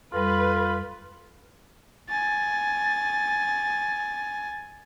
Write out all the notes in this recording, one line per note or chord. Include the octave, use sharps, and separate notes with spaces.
F2 G3 F4 A4 B4
G#5 A6